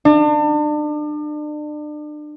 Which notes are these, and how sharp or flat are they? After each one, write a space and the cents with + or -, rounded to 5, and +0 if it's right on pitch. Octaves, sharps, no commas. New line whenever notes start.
D4 +35